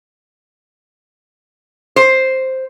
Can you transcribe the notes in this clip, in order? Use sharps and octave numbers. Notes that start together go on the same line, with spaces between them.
C5